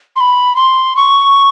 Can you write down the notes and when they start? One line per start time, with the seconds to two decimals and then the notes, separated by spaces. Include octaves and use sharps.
0.16 C6
0.20 B5
0.56 C6
0.96 C#6